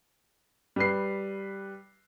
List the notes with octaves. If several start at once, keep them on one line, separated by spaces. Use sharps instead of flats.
G3 B4 C7